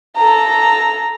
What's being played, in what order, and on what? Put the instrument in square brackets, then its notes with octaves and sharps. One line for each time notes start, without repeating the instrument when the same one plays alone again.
[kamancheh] A4 A#5